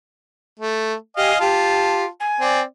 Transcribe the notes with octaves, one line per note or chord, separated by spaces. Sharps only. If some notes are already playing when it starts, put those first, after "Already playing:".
A3
G4 D#5 F5 G#5
F4 G4 A5
G#5
C4 D5